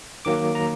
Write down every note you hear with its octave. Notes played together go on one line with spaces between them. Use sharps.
D#3 F#3 A#3 D6
A#5